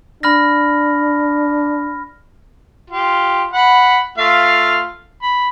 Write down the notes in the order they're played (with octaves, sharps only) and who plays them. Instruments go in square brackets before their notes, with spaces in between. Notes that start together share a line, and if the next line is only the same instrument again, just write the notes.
[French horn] D4 [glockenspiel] B5 F6 A#6
[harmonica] F4 G4
F#5 B5
A3 F4 F5
B5